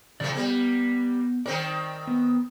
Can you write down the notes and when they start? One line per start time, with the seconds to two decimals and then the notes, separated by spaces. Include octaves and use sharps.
0.20 F2 A#2 C#3 A3 D5
0.35 G3 A#3 B3
1.46 D#3 C4 A#4 D5 G5
2.07 B3